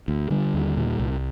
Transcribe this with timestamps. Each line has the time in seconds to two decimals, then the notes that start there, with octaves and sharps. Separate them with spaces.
0.08 D2
0.30 D3 G3
0.54 D#2
0.77 A#2
0.99 C2